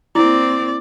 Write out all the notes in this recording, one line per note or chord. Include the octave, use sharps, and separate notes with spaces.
A#3 C4 E4 D5